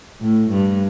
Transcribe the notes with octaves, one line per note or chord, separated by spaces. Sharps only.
A2
G2